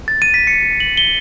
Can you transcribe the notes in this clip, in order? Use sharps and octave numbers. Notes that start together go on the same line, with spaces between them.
A6
D#7
B6
C#7
F#7
G7